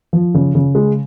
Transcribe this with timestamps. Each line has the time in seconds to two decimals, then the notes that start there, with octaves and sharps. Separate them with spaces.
0.13 F3
0.34 C#3
0.55 C#3
0.75 G#3